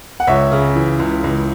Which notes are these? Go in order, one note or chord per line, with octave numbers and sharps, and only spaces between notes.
F#5
C#2 C#5 E5
C#3
E3
C#2
C#2